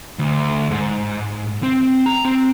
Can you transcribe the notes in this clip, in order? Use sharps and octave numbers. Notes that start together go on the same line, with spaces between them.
D2
G#2
C4
A#5
C4